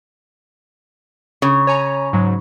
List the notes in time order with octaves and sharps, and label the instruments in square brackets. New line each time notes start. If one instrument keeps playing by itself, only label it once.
[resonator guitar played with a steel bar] C#3 [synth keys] C#5
[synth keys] C#5 G#5 A#5
G#2 F#3